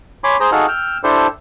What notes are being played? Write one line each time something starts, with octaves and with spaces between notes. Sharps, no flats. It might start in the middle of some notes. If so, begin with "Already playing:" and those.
C#5 G#5 B5 C6 D6
G#4 C5 A#5
D#4 F#4 G#4 A4 F5
G5 E6 F6
D4 E4 G4 A4 C5